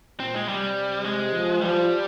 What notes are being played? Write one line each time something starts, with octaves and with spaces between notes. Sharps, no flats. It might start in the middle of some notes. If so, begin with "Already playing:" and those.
A#2 C4
G#3
C3 G3
G#3
F3
F3 G3